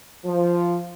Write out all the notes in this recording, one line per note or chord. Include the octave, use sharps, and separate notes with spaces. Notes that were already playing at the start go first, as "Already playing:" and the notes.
F3